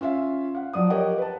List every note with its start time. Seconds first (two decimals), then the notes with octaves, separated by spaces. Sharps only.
0.01 C#4 F4 E5 F5
0.55 F5 F#5
0.73 F3 F#3 D5 D#6
0.90 G4 A#4 C#5 D#5 F#5 G5
1.18 B4 A5